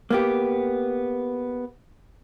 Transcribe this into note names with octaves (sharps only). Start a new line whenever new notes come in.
A#3 B3 G4